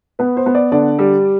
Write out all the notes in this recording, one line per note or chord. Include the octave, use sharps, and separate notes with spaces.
B3 B4
C5
B3
D5
D3 D5
G3